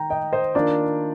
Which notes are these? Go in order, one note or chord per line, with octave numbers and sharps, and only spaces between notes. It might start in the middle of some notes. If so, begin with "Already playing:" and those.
Already playing: D#3 G5 A#5
D#5 G5
C5 D#5
D#3 A#3 D4 F4 A#4 D5